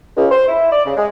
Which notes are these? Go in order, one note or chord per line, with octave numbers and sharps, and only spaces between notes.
C#2
C5
E4
D5
C#3
G#3